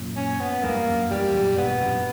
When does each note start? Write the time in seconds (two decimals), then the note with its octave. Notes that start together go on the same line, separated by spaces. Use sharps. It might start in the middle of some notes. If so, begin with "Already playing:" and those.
Already playing: F#2 A#2
0.17 C#4
0.40 B3
0.63 E2 G2 A#3
0.87 F#2
1.11 E2 G2 G3
1.34 F#2 A#2
1.57 G2 B2 B3
1.81 F#2 A#2